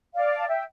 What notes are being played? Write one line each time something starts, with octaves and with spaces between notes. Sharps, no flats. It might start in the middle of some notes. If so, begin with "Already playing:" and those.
D5 F5
A5
E5 G5